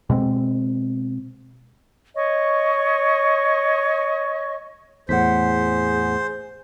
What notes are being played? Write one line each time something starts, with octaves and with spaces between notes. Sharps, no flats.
B2 G#3 C4
C#5 D#5 C#6
E2 A2 G#4 C5 F#5 B6